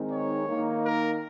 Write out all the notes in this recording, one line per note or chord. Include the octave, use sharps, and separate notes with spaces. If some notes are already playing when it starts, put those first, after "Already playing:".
Already playing: D#3 G#3 C4 D#4
C#5
D#3 A#3 D#4
A#4